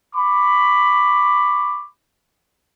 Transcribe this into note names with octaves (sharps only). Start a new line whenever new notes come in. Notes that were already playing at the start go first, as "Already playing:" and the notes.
B5 C#6 D6